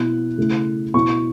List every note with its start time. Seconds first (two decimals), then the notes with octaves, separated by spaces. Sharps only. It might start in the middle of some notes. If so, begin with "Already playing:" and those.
Already playing: B2 B3 E4 F#6
0.38 C#3 A3 E4
0.94 B2 B3 E4 C#6